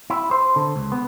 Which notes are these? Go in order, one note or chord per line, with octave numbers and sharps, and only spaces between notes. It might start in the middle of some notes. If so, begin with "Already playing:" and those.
E4
C5
D3
C#2
B3